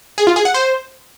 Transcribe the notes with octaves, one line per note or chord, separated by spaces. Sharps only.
G#4
F4
G#4
F#5
C5